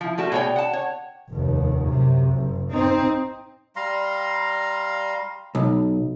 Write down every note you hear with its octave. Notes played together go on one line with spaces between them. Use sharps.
F3 E4
G3 A3 F#4 A5
B2 G#4 C#5 D5 G5
F#5 A5
C#5
F1 D#2
F#2 C3
F#1
C4 D#4
G3 F5 A#5 C6
B1